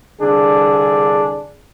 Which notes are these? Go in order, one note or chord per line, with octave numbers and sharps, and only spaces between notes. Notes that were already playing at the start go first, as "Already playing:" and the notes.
C2 D3 D4 G#4